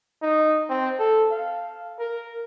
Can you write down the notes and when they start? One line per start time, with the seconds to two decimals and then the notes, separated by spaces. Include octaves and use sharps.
0.22 D#4
0.69 C4
0.99 A4
1.31 F5
1.99 A#4